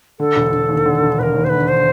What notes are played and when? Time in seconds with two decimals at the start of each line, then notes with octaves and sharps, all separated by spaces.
0.19 D3 A4
0.36 E1
0.52 E1
0.69 D#2
0.86 D3
1.02 E1
1.19 E1 A#4 B4
1.35 D#2
1.44 C5
1.49 D3 B4
1.68 C5